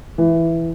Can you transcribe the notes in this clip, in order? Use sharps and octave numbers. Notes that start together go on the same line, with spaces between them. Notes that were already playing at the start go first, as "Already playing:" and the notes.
E3